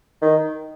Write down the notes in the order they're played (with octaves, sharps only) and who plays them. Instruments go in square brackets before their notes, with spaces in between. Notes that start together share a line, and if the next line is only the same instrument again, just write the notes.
[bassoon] D#3